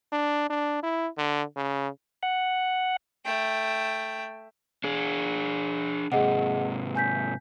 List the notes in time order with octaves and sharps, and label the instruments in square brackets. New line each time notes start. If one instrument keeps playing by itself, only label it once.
[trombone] D4
D4
E4
D3
C#3
[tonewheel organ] F#5
[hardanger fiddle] A3 G5
[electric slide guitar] D4 G#4
[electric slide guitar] G#2 C3 [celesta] G#4 D#5 F#5
[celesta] G#5 G6 B6